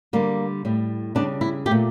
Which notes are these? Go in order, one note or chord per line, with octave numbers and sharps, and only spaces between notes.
D3 G3 A#3
A2 G3
C#3 G3 D4
E4
A3 G4
A#2